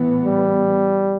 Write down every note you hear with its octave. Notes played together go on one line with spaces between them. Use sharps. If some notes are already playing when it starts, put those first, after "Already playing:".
Already playing: A2 E3 B3
G3